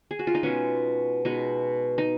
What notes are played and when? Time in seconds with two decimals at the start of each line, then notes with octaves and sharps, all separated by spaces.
0.11 G#4
0.19 F#4
0.27 F4
0.35 D#4
0.43 B2 G#3 B3 C#4
1.25 B2 G#3 B3 D#4
1.98 D#4